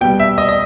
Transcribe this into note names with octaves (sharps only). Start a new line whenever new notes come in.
B2 G3 G5
E5
D#5
D#5